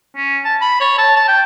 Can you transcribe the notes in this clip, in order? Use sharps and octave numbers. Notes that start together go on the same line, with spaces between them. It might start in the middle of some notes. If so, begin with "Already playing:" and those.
C#4
A5
B5
C#5
A5
A5
G5